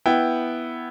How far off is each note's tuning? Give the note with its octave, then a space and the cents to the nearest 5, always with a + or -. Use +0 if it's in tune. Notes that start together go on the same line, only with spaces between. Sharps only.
B3 +0 E4 +0 G5 +0